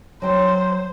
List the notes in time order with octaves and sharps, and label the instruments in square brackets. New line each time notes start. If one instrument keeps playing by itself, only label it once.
[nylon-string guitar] F#3 G5 [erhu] C5